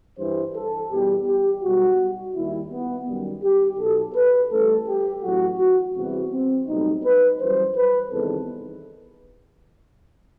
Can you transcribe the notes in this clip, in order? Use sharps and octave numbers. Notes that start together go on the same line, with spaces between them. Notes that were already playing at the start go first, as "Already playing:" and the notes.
G2 E3 G3 C5
A4
E2 B2 G3 G4
G4
B1 B2 G3 F#4
D#2 D#3 G3 E4
B3
F#2 D#3 G3
G4
B1 B2 F#3 A4
B4
A1 A2 G3 A4
G4
A1 A2 F#3 F#4
F#4
E2 C3 E3 G3 F#4
C4
B1 A2 G3 D#4
B4
F#2 E3 G3 C5
B4
E2 C3 D#3 G3 A4